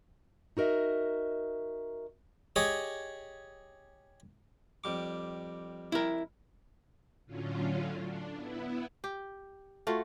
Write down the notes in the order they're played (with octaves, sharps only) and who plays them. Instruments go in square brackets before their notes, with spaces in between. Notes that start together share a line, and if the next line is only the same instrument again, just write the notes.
[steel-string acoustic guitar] D#4 F#4 A#4 D#5 E5
[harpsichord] G4 G#4 C#5 D#5
F2 G3 D6
[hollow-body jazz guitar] E4 A#4
[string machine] A2 D3 F#3 C#4 F4
D4
B3 E4
[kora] G4
A3 F4 F#4